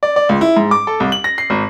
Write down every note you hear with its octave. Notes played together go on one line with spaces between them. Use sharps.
D5
D5
C#2
E4
G#2
D6
A4
C2
F#7
A#6
C7
G#1